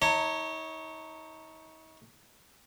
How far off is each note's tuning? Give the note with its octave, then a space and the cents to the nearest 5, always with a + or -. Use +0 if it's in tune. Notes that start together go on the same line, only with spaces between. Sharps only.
D#4 +40 C#5 +0 A#5 -45